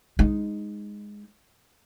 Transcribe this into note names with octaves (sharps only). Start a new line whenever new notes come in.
G#3 D#4